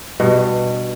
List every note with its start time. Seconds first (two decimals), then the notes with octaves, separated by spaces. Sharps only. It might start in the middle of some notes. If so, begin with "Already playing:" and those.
0.20 G2 B2